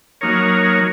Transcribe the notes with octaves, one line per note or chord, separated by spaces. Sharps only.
F#3 A#3 D#4 A#4 C#5